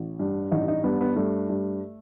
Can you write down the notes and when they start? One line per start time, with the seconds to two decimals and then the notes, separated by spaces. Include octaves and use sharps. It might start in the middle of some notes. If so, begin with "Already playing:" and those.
Already playing: A1
0.19 G2
0.51 A1 D#4
0.68 D#4
0.84 G2 B3
1.01 B3
1.16 G2 A3
1.49 G2